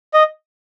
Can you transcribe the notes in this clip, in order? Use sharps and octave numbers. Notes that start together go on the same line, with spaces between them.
D#5